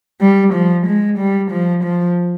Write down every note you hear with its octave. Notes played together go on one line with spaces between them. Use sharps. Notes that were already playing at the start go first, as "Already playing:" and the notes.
G3
F3
G#3
G3
F3
F3